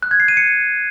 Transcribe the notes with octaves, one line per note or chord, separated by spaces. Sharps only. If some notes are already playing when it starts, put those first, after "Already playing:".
F#6
G#6
C7
D#7
C#7